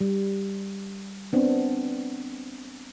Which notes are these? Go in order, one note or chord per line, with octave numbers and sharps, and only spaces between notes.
G3
B3 C4 D4